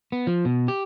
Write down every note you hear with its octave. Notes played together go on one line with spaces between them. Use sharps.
B3
F3
B2
G4